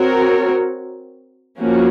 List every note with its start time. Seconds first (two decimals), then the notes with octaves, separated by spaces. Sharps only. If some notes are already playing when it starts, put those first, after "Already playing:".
Already playing: C4 F#4 A#4 C#5
1.58 F3 A#3 C#4 F#4